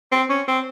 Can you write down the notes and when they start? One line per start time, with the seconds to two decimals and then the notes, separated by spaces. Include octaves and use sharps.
0.11 C4
0.29 C#4
0.48 C4